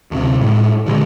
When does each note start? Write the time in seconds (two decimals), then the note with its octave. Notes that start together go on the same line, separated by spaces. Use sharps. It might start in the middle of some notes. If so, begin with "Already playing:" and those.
0.11 D2 C3
0.41 A2 G#3
0.86 A#2 D3 E3 G#3